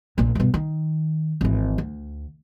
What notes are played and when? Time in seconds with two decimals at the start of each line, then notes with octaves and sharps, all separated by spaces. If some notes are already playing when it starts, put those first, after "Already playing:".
0.18 A#1 A#2
0.35 G2 B2
0.54 D#3
1.41 G#1 E3
1.78 D2